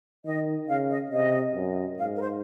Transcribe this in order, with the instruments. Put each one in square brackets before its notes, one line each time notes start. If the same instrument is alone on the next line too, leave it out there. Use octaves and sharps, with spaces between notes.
[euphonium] D#3 [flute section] D#5
[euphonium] C#3 [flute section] F5
[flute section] D#5
[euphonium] C3 [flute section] D#5
[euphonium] F#2
[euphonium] G#2 [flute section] F5
[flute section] A#4
C5